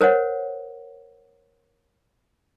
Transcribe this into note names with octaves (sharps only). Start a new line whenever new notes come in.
A#4 C5 C#5 F#5